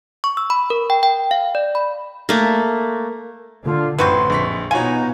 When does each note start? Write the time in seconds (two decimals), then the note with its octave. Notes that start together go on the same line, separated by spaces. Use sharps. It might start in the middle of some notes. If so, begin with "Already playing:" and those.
0.24 C#6
0.37 E6
0.50 B5
0.70 A#4
0.90 G5
1.03 G5
1.31 F5
1.55 D5
1.75 B5
2.29 A3 A#3
3.65 D3 F4
3.99 A1 F#2 D3 C4 F#4 B4 C6
4.30 A#1 F2 C#6 B6
4.71 B2 B3 D#4 F4 F#4 C#5 G#5